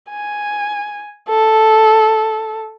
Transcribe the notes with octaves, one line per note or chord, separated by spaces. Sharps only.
G#5
A4